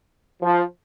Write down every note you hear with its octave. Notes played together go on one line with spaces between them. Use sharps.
F3